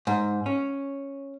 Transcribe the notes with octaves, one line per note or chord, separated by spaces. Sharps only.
G#2
C#4